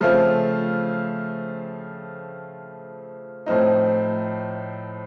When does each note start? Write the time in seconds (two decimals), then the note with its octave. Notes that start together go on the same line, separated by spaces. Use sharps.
0.01 C#3 F3 A3 C4 F4
3.46 A2 F3 C4 D#4